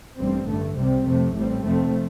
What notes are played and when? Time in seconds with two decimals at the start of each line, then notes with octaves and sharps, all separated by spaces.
0.18 A1 G2 G3 C4
0.48 G2 D3 A3
0.76 C2 C3 G3 C4
1.06 F2 C3 A3
1.35 A1 A2 G3 C4
1.65 F1 F2 F3 A3 C4